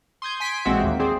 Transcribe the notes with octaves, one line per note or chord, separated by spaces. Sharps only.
C6 D#6 G6 G#6
G#5 C6 B6 D7
A1 A#2 G#3 C4 F#4 E5
D#2 A#2 A#3
C4 G#4 C5 D5